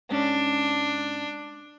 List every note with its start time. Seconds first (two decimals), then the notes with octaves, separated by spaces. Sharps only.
0.11 G#2 C#4 D4